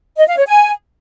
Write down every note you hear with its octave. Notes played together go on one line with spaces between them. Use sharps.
D#5
F5
C#5
G#5